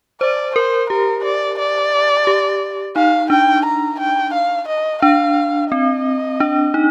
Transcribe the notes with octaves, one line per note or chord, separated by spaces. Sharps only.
C5 D5
A#4 C5
G4 A#4
D5
D5
G4
D#4 F5
D4 G5
A#5
G5
F5
D#5
D4 F5
C4 D#5
D4
D#4